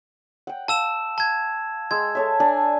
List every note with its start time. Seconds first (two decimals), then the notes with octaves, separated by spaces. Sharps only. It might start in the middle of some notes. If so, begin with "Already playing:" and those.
0.47 F#5 G5
0.68 F5 A5 E6 E7
1.18 A5 G#6
1.91 G#3 E6 G#6
2.15 A4 C#5 E5
2.40 D4 D5 G#5